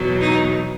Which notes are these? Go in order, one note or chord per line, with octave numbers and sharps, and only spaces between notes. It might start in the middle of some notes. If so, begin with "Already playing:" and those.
Already playing: E2 B2 F#3
D#4